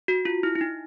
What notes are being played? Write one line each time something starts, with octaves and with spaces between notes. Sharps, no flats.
F#4
F4
E4
E4
D#4